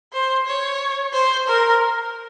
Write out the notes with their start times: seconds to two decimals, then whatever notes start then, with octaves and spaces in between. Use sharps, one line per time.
0.13 C5
0.46 C#5
1.13 C5
1.47 A#4